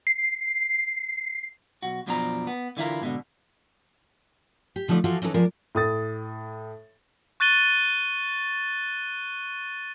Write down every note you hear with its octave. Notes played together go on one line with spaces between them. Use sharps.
C7
B1 F#4
F#2 B2 F3 D4 C#5 A#5
B3
D3 E3 E4 F4 A#4
G#2 B2 D3
G4
D3 F3 A3 D#4 D5
E3 F3 F4 F#4 A4
E3 C#4 D#4 G#4 A4 B4
F3 G#3 A#4 D5
A2 D#6 A6
C#6 F#6 A6 D#7 G7